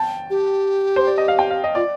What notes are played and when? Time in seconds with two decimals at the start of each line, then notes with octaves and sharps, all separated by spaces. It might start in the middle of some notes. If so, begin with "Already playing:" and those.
Already playing: G5 A5
0.30 G4
0.96 C5
1.07 D5
1.18 D#5
1.28 F5
1.39 G5
1.51 F5
1.64 D#5
1.75 F4 D5